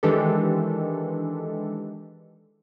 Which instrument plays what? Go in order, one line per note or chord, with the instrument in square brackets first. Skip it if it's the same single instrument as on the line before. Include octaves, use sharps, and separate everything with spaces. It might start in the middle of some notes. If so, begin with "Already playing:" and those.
[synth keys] D#3 E3 G#3 D4 G4 A4